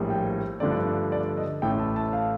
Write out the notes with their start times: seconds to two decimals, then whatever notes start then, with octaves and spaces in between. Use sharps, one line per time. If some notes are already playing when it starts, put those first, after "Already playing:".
Already playing: A#1 A2 G3 A#3
0.10 G5
0.60 G2 D3 F3 A3 D5
1.12 D5
1.37 D#5
1.62 A1 A2 A3 G5
1.80 A5
1.96 A5
2.13 F5